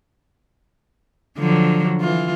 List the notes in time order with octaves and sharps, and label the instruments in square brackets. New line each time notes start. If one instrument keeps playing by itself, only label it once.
[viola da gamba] D3 F3 F#3
E3 F4